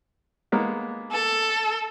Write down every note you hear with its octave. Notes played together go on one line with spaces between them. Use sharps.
G#3 A#3 B3
A4